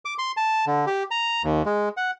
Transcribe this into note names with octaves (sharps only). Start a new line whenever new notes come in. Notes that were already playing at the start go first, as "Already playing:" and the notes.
D6
C6
A5
D3
G4
A#5
D#2
G#3
F#5